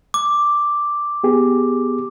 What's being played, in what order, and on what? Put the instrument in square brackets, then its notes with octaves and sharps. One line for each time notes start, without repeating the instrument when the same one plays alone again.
[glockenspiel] D6
[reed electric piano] B3 G4 G#4